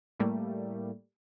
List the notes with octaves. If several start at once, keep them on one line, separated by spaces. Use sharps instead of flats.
A2 G3 A3 A#3